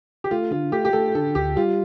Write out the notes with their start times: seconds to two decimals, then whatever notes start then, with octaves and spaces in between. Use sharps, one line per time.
0.24 G4
0.31 A3 F4
0.51 D3 F4
0.72 A3 G4
0.85 G4
0.93 A3 A4
1.15 D3 A4
1.35 D2 G4
1.56 G3 F4